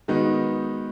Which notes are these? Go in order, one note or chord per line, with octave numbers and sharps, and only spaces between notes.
D#3 G#3 B3 D#4 F#4